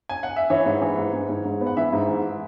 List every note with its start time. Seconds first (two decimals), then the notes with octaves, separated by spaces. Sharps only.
0.09 G#5
0.23 F#5
0.36 E5
0.50 E3 C#5
0.66 G#2
0.82 E3
0.98 G#2
1.13 G#2
1.29 G#2
1.45 G#2
1.61 B3
1.67 F#5
1.77 E3 E5
1.93 G#2
2.08 E3